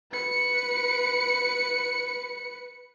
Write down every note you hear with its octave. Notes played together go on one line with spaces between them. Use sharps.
B4 C#7